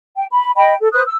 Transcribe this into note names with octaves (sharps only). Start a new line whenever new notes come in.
G5
B5
D#5 G5 B5
A4
B4 C5 D#6 F#6
E6